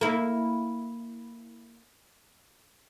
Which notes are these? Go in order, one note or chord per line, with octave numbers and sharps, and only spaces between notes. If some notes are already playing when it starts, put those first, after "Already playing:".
A#3 E4